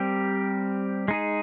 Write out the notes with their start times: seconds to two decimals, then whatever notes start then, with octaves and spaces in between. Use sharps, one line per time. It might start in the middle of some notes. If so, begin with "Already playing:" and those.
Already playing: G3 C4 G4 A#4
1.08 G#3 D#4 G#4